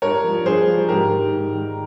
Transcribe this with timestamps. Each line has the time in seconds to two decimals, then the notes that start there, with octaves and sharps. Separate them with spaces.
0.02 G2 A#4 C#5
0.24 F3
0.45 G2 G#4 C5
0.67 F3
0.89 G#2 G4 A#4
1.11 D#3
1.33 G#2
1.54 D#3